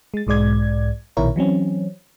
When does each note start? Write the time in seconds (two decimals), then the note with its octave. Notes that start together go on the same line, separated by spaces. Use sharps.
0.14 G#3 A6
0.27 B1 G#2 G#3 D5 G#6
1.17 A#1 B2 D#3 E4 A#4 C#5
1.36 E3 F#3 C4 C#4